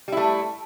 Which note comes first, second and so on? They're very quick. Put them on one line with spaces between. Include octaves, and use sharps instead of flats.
G3 E4 A3